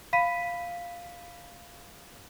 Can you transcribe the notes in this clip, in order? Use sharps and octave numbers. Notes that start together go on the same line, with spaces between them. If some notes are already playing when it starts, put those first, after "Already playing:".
F5 B5 B6 D#7